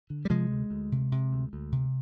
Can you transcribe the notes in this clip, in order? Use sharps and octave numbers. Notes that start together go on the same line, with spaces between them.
D3
G3
C3 F3 G#3
D2
D2
C3
C3
D2
D2
C3